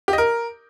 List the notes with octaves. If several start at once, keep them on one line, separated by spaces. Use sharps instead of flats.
G4
D#5
A#4